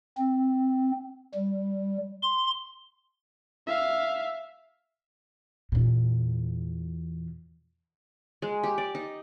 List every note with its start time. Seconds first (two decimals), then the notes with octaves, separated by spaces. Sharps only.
0.17 C4
1.34 G3
2.22 C6
3.67 E5 F5
5.72 E2 A#2
8.42 G#3
8.63 G4
8.78 D5
8.95 D#4